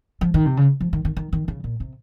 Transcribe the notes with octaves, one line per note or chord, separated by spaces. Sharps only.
F3
D#3
C3
C#3
F3
D#3
D#3
D#3
D#3
C#3
A#2
C3